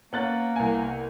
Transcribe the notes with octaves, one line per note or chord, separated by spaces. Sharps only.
A#3 B3 C#4 F#6 A6
C2 G#5